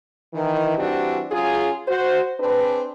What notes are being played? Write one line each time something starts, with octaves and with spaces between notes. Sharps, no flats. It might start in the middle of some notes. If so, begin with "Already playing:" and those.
D#3 E3
E3 G3 C4 D4 F#4 G4
F#3 C#4 F4 G#4
F#4 C5
C4 D4 G#4 B4